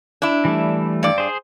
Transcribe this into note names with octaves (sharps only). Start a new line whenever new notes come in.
D4 E4
E3 G3 A3
G2 D5
G#4 C5